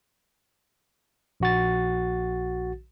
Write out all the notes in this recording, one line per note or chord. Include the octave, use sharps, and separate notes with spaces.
A#1 F#4 A6